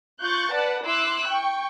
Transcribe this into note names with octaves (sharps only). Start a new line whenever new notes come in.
F4 C#6 F#6 G6 A6
B4 D5 F#5 A5
E4 C6 D6 E6 F#6
G5 C#6